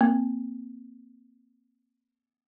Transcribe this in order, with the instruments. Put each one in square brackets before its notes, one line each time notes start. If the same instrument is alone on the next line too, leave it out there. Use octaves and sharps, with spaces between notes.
[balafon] A#3 C4